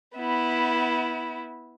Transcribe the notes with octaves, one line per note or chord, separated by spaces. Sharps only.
B3 E4